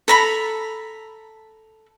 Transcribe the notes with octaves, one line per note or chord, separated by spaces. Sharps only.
A4 A#5 B5